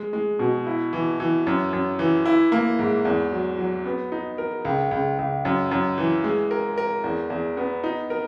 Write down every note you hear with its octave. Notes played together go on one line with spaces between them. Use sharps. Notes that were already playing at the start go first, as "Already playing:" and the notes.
Already playing: G#3
G#3
B2
E4
E3
E3
F#2
F#2
E3
E4
A#3
G#2
E2
F#3
F#3
B3
D#4
A#4
C#2
C#2
C#2
F#2
F#2
E3
G#3
A#4
A#4
E2
E2
B3
D#4
A#4